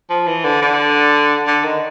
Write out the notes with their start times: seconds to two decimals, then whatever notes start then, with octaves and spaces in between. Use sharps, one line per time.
0.10 F3
0.27 E3
0.44 D3
0.62 D3
1.47 D3
1.64 D#3